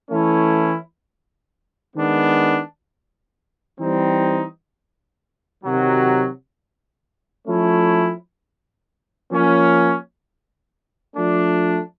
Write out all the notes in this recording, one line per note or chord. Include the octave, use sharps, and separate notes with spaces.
E3 A3 C#4 E4
D#3 G#3 B3 D4
E3 G3 C4 D#4
C3 D#3 F#3
F3 A3 C#4 E4
F3 A#3 C#4
F3 A3 D4